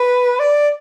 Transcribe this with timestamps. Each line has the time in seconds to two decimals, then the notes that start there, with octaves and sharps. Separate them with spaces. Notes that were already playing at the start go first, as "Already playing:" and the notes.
Already playing: B4
0.39 D5